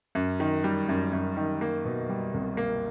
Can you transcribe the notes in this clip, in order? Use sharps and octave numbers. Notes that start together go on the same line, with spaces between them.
F#2
D#3
G3
F#2
F#2
D#3
A#3
B2
G3
C2
A#3